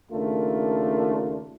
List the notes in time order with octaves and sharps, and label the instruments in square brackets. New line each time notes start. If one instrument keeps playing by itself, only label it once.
[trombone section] D#2 C#3 A3 D4 F4 A#4